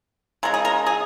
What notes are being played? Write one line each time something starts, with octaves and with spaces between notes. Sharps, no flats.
C#3 F3 G#3 A#4
G#4
A#4
G#4